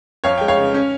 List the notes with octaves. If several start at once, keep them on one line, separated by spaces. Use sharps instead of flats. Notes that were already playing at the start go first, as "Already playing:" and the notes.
F2 C#5 F5
G#3 G5
C#5 F5
C#3
C#4